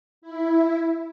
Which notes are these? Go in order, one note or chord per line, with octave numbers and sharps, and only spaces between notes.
E4